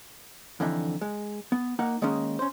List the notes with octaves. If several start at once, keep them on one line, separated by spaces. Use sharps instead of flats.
F2 D3 E3 D#4 E5
G#3
B3
A#3 D#4 A#4 F#5
D#3 G#3 A#3 C#4 D#4 A#4
C#4 C5